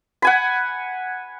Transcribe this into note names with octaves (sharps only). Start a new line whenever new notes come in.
F#5 G#5 B5